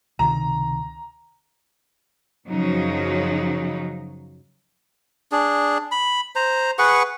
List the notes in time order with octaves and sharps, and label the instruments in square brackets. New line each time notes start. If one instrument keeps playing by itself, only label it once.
[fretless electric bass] C#2 C3 D#3 [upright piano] A#5
[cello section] F#2 C#3 F3 F#3 D#4
[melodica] D4 G#4
B5
C5 A#5
G#4 B4 F#5 C#6